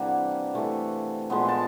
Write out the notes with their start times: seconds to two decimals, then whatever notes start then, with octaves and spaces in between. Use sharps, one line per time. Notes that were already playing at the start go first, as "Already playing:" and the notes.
Already playing: C3 E3 G3 A#3 D4 F#5
0.54 C3 E3 A3
1.30 A#2 F3 G#3 B3
1.48 A5